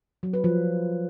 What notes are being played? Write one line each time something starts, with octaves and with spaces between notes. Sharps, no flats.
F#3
B4
F3